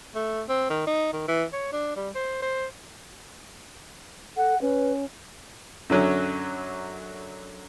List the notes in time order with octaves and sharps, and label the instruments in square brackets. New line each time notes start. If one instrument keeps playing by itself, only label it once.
[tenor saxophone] A3
C4
D#3
D#4
D#3
E3
C#5
D4
G3
C5
C5
[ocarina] A4 [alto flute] F#5
[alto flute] C#4 [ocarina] B4
[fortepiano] F#2 D3 F#3 C#4